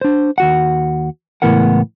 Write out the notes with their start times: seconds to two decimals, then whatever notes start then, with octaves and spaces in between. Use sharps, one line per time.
0.01 D4 C5
0.38 D#2 F#4 F#5
1.42 C#2 A2 E3 B3 A#4 F#5